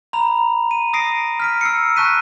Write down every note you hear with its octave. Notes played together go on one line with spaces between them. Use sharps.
A#5 B5 F7
D#7
D#6 A#6 C7 D7
F6 B6 D7
E6 C7 C#7
A5 C#6 F#6 B6 D#7